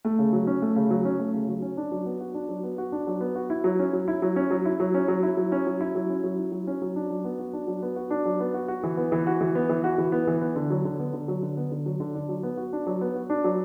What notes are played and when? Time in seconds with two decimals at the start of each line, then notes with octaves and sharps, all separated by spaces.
0.05 A3
0.19 C#3
0.33 F#3
0.47 C#4
0.62 A3
0.76 C#3
0.90 F#3
1.05 C#4
1.19 A3
1.34 C#3
1.48 F#3
1.62 C#4
1.77 D4
1.92 F#3
2.06 B3
2.20 F#4
2.34 D4
2.49 F#3
2.63 B3
2.78 F#4
2.92 D4
3.07 F#3
3.21 B3
3.35 F#4
3.50 E4
3.64 F#3
3.79 C#4
3.93 F#3
4.08 E4
4.22 F#3
4.36 C#4
4.51 F#3
4.65 E4
4.80 F#3
4.94 C#4
5.08 F#3
5.23 E4
5.37 F#3
5.52 C#4
5.67 F#3
5.81 E4
5.95 F#3
6.10 C#4
6.24 F#3
6.38 E4
6.52 F#3
6.67 C#4
6.82 F#3
6.96 D4
7.10 F#3
7.25 B3
7.39 F#4
7.53 D4
7.67 F#3
7.82 B3
7.96 F#4
8.10 D4
8.25 F#3
8.40 B3
8.54 F#4
8.68 F#4
8.83 E3
8.97 B3
9.12 E3
9.27 F#4
9.41 E3
9.55 B3
9.69 E3
9.84 F#4
9.98 E3
10.12 B3
10.27 E3
10.41 B3
10.56 D3
10.70 F#3
10.84 D3
10.99 B3
11.13 D3
11.28 F#3
11.42 D3
11.57 B3
11.72 D3
11.86 F#3
12.00 D3
12.15 D4
12.29 F#3
12.43 B3
12.57 F#4
12.73 D4
12.87 F#3
13.01 B3
13.15 F#4
13.30 D4
13.44 F#3